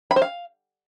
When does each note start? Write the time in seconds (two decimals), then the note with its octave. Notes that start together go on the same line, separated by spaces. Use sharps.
0.11 B5
0.16 C5
0.22 F5